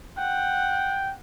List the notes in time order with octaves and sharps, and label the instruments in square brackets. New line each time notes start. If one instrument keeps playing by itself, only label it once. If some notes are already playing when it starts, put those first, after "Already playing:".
[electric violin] F#5 [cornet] G5